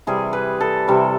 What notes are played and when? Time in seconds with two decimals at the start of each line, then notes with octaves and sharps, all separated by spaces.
0.07 C3 E3 G3 G#4
0.33 B4
0.61 A4
0.88 C3 E3 G3